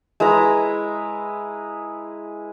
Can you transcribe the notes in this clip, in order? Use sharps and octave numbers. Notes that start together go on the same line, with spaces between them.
G#3 E4 B4 A#5